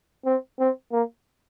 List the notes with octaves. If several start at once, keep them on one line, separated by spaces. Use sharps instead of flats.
C4
C4
A#3